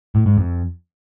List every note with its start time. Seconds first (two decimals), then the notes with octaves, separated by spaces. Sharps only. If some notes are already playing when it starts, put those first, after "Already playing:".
0.15 A2
0.26 G#2
0.38 F2